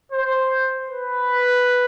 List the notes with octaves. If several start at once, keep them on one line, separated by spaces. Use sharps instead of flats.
C5
B4